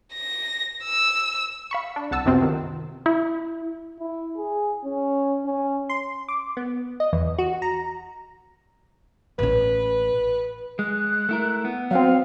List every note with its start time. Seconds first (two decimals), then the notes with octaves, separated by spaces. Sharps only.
0.13 A#6
0.84 E6
1.71 F5 B5 C#6
1.96 D4
2.11 C2 F#5 A5 E6
2.26 F#2 C3 B3 C4 F4
2.42 D#3
3.06 E4
4.00 E4
4.37 G#4
4.85 C#4
5.46 C#4
5.89 C6
6.28 D6
6.57 B3
7.00 D#5
7.13 E2
7.38 F#4
7.62 A#5
9.39 A1 C#4 B4
10.79 G#3 F#6
11.29 A3 E4 A#4
11.65 B3
11.91 F#3 C4 F5